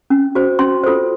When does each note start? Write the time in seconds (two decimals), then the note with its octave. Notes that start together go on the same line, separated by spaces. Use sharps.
0.10 C#4
0.35 F#4 C5
0.59 C#4 C6
0.84 F4 A4 C5